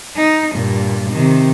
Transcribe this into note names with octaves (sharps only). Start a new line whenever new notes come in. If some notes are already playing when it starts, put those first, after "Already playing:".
D#4
G2 A#2
C3 D#3